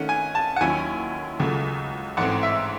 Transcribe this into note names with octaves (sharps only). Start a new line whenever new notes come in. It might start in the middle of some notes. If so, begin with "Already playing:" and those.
Already playing: D#3 A3 C#4 F#5
G#5
A5
F#5
D#2 D#3 F#3 C#4 E4 G#5
C#2 C#3 F#3 A3
A1 G#2 E3 A3 C4 F#5
E5